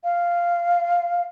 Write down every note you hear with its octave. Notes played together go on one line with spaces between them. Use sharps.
F5